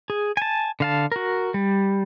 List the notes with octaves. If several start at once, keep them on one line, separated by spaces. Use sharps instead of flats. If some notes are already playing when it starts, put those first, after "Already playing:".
G#4
G#5 A5
D3 F5 A5
F#4 A#4
G3